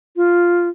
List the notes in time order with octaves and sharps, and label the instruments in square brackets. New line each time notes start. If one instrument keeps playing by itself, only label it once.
[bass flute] F4